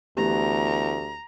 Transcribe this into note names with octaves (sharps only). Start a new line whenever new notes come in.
D2 E3 A3 B3 G4 A#5